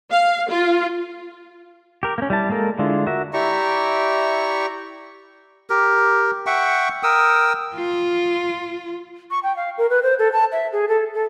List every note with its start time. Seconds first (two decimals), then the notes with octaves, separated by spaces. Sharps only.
0.12 F5
0.50 F4
2.03 G4 A#4
2.18 A#3 C#4
2.30 G3 E4 A5
2.49 G#3 A#3 A4 A#4
2.79 D3 G#3 D4 E4 F4
3.07 F#4 A#4 E5
3.34 E4 G4 D5 E5 A#5 C#6
5.70 G4 A#4
6.46 E5 F#5 G5 C#6
7.03 A#4 G5 D#6 E6
7.75 F4
9.31 C#6
9.43 G5
9.56 F5
9.78 A#4
9.90 B4
10.03 C5
10.19 A4
10.32 A5
10.52 E5
10.72 G#4
10.88 A4
11.14 A4